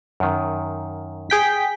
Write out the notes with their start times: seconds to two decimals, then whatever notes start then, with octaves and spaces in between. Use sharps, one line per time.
0.20 F#2 D#3
1.30 G#4 G5 B6